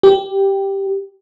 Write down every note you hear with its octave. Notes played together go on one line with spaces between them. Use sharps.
G4